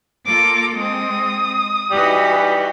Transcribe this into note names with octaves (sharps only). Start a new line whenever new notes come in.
A#3 F4 A4 D6
G#3 C4 D#6
E3 G3 D#4 F#4 B4